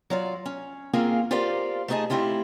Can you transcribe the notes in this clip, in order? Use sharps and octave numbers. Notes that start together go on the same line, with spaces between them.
F#3 F4 D5
C#4
A#3 C4 C#4 F4 G#4 A#4
F4 G4 A#4 C5 D5 F5
A3 B3 D#4 G#4 D#5 A5
A3 C4 E4 F4 G4